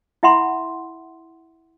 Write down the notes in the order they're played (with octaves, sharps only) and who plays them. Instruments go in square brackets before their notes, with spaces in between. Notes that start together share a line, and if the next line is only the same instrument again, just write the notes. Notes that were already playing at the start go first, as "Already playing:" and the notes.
[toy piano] E4 E5 F#5 B5 C6